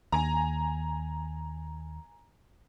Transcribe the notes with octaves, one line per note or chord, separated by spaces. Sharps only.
D#2 G#5 A#5